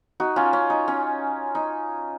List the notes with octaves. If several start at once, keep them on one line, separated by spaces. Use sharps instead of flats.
D#4 F#4
C#4 F4
C#4
D#4
C#4
D#4